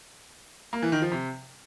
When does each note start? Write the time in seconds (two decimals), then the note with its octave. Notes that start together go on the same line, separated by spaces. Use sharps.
0.73 A#3
0.82 E3
0.92 D#3
1.02 F3
1.11 C3